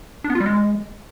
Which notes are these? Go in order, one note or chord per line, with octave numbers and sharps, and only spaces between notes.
D4
B3
F4
G3
G#3